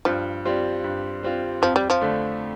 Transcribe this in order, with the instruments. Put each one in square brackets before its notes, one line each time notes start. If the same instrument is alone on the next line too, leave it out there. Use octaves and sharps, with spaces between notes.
[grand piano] G2 [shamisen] F3
[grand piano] G3 C4 F4
G2
G3 C4 F4
[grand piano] F2 [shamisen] F3
[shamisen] G3
F3
[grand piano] D3 A3